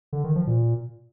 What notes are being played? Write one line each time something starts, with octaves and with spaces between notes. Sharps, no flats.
D3
D#3
F3
A#2